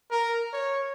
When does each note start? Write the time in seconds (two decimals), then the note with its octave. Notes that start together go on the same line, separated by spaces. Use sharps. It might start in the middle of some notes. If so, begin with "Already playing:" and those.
0.11 A#4
0.53 C#5